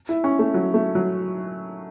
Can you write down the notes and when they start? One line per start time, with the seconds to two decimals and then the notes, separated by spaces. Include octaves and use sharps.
0.09 E4
0.24 C#4
0.39 A3
0.54 F#3
0.74 A3
0.95 F#3